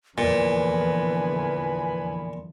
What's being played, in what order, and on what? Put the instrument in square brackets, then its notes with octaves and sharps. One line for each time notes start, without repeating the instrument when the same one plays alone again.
[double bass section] E2 D3 F3 [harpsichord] A#2 [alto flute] B4 [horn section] G#5 B5